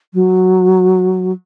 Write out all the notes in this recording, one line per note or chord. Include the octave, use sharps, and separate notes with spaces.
F#3